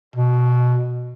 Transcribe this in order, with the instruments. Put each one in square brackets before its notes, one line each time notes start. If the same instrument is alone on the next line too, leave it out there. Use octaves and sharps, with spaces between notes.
[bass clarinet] B2